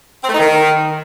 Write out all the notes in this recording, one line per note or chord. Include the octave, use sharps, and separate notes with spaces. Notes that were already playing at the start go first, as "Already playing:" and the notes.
C4
A3
D#4
D#3